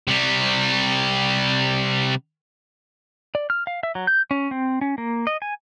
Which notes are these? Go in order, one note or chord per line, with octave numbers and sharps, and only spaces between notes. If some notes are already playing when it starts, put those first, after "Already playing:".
C3 G3
D5
F6
F5
E5
F#3
G6
C#4
C4
C#4
A#3
D#5
G#5